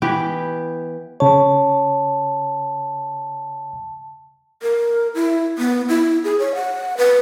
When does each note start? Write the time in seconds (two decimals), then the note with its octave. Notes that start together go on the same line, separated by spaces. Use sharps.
0.02 E3 B3 G4
1.20 C#3 C#5 A5
4.62 A#4
5.15 E4
5.58 B3
5.89 E4
6.24 G#4
6.39 C#5
6.55 F#5
6.98 B4